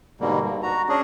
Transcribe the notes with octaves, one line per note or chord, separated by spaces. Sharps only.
G#2 B2 D3 G3 A#3
G2
F#4 A#5
C#4 D4 G#4